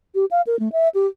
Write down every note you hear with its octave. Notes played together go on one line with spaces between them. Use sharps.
G4
F5
A#4
A3
E5
G4